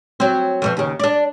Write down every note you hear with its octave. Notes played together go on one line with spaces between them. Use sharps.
F#3 C4
F2 B2 F3
D#2 C#3
D4 D5